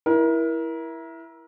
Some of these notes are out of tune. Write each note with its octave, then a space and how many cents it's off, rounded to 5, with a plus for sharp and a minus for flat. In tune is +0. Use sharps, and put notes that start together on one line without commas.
E4 +0 A#4 +30